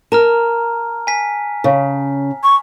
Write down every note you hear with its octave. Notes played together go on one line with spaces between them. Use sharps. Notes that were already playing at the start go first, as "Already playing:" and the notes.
A#4 A5 A#5 F6
G#5 B6
C#3
C#6